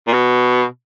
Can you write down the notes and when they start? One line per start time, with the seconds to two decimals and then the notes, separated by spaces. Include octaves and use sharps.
0.07 A#2
0.13 B2